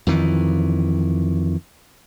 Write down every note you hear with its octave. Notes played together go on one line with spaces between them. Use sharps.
F2 D#3 E3